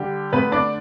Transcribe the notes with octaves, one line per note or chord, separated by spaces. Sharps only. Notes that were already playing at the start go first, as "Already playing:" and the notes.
Already playing: D3 G3 G4
D3 A3 B3 B4
D4 D5